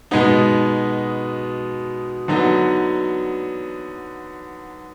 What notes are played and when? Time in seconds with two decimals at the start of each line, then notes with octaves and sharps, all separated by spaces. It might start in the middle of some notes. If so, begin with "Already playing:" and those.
0.11 B2 G#3 B3 D#4
2.28 D3 F#3 B3 D#4